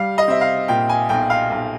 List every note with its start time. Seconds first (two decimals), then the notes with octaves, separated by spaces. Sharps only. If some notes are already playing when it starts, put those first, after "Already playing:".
Already playing: G3 F5
0.18 D#5
0.28 C4 E5
0.41 F5
0.68 A#2 G5
0.89 G#5
1.09 B1 G5
1.30 F5
1.50 B1